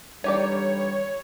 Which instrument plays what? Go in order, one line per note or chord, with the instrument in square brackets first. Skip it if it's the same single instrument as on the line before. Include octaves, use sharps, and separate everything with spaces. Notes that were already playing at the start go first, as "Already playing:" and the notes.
[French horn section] D3 E3 G3 [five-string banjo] D#4 G4 D5 [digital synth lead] C#5